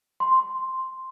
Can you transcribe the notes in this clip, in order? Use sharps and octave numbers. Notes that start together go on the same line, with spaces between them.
C6